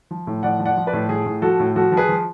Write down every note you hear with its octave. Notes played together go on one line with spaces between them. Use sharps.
F3
A2
F3 D5 F#5
F3
D5 F#5
F3
B4 D5
A2
F3 G#4
A2
F3 F#4 A4
A2
F3 F#4 A4
F3
G#4 B4
F3